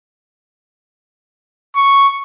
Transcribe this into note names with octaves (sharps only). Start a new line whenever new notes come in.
C#6